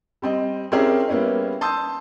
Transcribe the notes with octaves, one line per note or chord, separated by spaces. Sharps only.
G3 C4 D#5
C4 C#4 E4 G4 G#4 A#4
G3 A#3 B3 C#4 E4
A5 C6 D#6 E6 G6